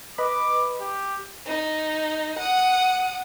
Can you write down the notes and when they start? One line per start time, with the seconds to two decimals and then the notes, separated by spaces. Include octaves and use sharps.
0.18 B4 D#5 B5 D6
0.81 G4
1.47 D#4
2.39 F#5 D#6